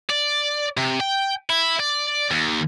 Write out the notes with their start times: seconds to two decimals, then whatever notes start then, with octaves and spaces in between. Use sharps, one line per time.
0.10 D5
0.77 C3
1.00 G5
1.50 E4
1.79 D5
2.31 D#2